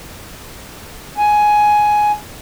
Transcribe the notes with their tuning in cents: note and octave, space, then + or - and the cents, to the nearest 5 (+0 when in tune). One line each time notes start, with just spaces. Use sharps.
G#5 +10